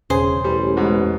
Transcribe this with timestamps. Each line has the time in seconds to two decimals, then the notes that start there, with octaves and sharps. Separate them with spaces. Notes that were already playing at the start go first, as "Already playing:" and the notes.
0.10 E1 C#3 G#4 C5
0.44 A1 G3
0.77 G#2 B2